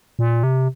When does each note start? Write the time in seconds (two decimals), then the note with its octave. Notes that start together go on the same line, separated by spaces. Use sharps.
0.19 A#2
0.43 C3